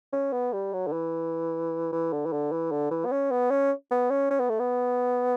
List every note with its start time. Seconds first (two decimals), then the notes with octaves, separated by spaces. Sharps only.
0.13 C#4
0.33 B3
0.53 G3
0.73 F#3
0.87 D3
0.93 E3
1.92 E3
2.13 D3
2.26 E3
2.32 D3
2.52 E3
2.72 D3
2.91 E3
3.05 B3
3.12 C#4
3.31 B3
3.51 C#4
3.91 B3
4.11 C#4
4.31 C#4
4.40 B3
4.50 A3
4.59 B3